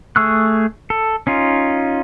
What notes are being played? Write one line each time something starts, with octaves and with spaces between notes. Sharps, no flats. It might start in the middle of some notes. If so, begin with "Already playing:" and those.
A3 G#4 C#6 E6 F#6
A4
C#4 D#4 F4